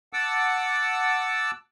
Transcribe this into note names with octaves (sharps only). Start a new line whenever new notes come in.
F#5 A5 D6 E6